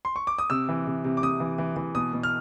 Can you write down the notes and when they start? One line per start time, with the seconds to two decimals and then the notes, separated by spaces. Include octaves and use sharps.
0.05 C6
0.16 C#6
0.27 D6
0.39 D#6
0.50 C3 E6
0.69 E3
0.87 C3
1.04 C3
1.17 D6
1.22 C3 D#6
1.40 E3
1.58 E3
1.76 E3
1.95 B2 D#6
2.13 B2
2.23 F6